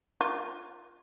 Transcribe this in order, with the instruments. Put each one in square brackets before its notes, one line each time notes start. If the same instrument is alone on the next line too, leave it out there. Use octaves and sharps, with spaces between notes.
[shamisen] F4